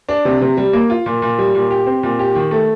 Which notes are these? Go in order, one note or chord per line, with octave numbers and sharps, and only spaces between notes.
D4
C3
C3
G3
A#3
F4
A#2
A#2
G3
A#2
G4
C4
A#2
G4
D#3
A3